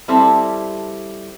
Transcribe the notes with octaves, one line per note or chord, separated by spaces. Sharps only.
G3 C4 E4 A4